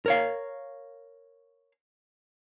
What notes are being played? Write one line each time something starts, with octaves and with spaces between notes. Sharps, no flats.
A#4 C#5 F5